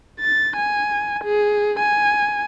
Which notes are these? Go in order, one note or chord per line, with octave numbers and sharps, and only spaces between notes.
A6
G#5
G#4
G#5